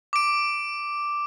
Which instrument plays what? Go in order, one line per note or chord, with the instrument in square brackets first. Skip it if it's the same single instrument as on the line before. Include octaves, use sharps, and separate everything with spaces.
[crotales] D6 D7